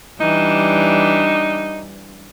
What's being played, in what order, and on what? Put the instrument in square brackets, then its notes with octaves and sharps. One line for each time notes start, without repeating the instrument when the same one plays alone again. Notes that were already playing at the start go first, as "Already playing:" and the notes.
[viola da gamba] E3 G3 D4 [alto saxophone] D#4